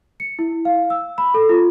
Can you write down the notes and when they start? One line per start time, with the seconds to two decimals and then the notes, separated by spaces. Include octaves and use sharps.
0.20 C#7
0.39 E4
0.65 F5
0.90 E6
1.18 B5
1.34 A4
1.49 F4